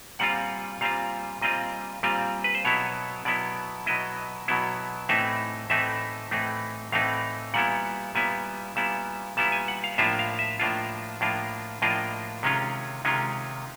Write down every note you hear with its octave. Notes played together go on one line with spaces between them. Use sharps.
A#2 G3 C4 F4 F#5
A#2 G3 C4 F4 F5
A#2 G3 C4 F4 D#5
A#2 G3 C4 F4
B4
C5
B2 F#3 B3 E4 C#5
B2 F#3 B3 E4 D5
B2 F#3 B3 E4 D#5
B2 F#3 B3 E4
A2 E3 A3 C4 D#4 E5
A2 E3 A3 C4 D#4 E5
A2 E3 A3 C4 D#4
A2 E3 A3 C4 D#4 F5
A#2 G3 B3 E4 F#5
A#2 G3 B3 E4 G#5
A#2 G3 B3 E4 A5
A#2 G3 B3 E4 A5
G#5
F#5
F5
A2 F3 A#3 D4 F4 E5
F5
E5
A2 F3 A#3 D4 F4
A2 F3 A#3 D4 F4
A2 F3 A#3 D4 F4 D#5
C3 D#3 G#3 C#4 F4
C3 D#3 G#3 C#4 F4